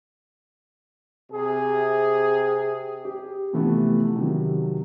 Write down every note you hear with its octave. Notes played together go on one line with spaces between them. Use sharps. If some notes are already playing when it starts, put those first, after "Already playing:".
C3 G#4
G4
C3 E3 F3 A3 B3
C3 D#3 F#3